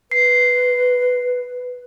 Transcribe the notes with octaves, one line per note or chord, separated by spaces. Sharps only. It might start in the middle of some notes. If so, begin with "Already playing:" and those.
B4 C7